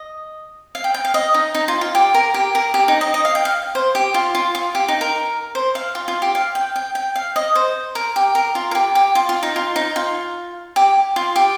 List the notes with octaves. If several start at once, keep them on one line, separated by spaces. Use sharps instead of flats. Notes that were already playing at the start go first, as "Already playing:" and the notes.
Already playing: D#5
F5
G5
G5
F5
D#5
D#4
D#4
F4
F4
G4
A#4
G4
A#4
G4
D#4
D#5
D#5
F5
G5
F5
C5
G4
F4
F4
F4
G4
D#4
A#4
C5
F5
F4
F4
G4
F5
G5
G5
G5
F5
D#5
C5
A#4
G4
A#4
F4
A#4
G4
G4
F4
F4
D#4
F4
D#4
F4
G4
F4
G4